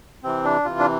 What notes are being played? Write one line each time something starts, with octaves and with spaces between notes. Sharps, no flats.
C3 E3 C4
D4
C3 E3 F4
D4